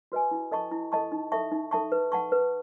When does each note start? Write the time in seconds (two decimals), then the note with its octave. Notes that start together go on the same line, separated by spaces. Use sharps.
0.12 F#4 B4 D#5 G#5
0.31 E4
0.52 A4 D#5 A5 C#6
0.71 E4
0.92 A4 D#5 A5 C#6
1.12 D#4
1.32 A4 E5 A5 C#6
1.52 D#4
1.71 A4 E5 A5 C#6
1.92 B4
2.12 F#5 A5 C#6
2.32 B4